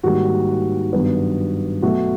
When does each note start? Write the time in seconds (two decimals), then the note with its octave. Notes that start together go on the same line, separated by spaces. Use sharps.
0.03 G#2 D#3 G3 A#3 F#4
0.93 G2 D#3 F#3 B3
1.82 B2 F#3 A3 F#4